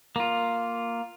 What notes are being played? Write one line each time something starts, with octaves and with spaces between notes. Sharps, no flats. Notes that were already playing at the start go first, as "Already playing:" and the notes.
A#3 F4